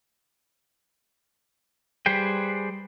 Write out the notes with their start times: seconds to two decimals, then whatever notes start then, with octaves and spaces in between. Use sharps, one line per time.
2.06 G3 G#4 B4 C5 G5